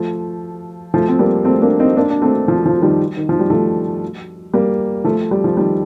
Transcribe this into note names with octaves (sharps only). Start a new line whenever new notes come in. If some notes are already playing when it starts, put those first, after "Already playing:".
Already playing: F3 A3
F3 A3
C4
G3 A#3
A3 C4
A#3 D4
C4 D#4
A#3 D4
D4
A3 C4
F3
F3
D#3 G3
D#3
F3
G3
F3 A3
G3 A#3
F3 A3
G3
F3
D#3 G3